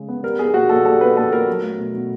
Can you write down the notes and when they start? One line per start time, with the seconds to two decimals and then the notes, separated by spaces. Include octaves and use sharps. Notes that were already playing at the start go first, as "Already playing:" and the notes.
Already playing: C#3 G#3
0.08 B3
0.23 G3 A#4
0.38 B3 G#4
0.54 A#2 F#4
0.69 A#2 A4
0.85 G3 A4
1.01 B3 B4
1.16 A#2 A4
1.32 A#2 A#4
1.48 F#3
1.63 A3
1.78 B2
1.94 B2